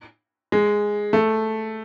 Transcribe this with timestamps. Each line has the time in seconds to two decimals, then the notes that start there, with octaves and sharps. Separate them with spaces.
0.52 G#3
1.13 A3